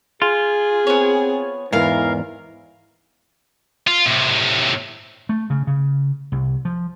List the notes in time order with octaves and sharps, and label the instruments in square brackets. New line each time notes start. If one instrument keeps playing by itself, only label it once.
[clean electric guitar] F4 [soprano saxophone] G#4
[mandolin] B3 C#5 [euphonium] C4
[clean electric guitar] E2 G#2 [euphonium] E3 [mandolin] A#4 F5
[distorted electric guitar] F4
A2 C3
[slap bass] A3
C#3
C#3
C2
F3